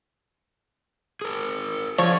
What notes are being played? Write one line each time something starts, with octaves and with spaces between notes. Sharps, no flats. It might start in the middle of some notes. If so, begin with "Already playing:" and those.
G#4 A#4
D3 F3 C#5 D5